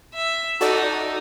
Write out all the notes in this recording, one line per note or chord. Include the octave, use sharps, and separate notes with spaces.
E5
D#4 F#4 A4 D5